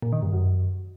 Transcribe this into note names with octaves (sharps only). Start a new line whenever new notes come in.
A#2
D#3
G2
F#2